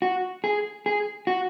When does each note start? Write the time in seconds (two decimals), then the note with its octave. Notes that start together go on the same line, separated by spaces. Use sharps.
0.02 F#4
0.44 G#4
0.86 G#4
1.27 F#4